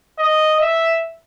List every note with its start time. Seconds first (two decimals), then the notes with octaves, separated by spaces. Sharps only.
0.19 D#5
0.61 E5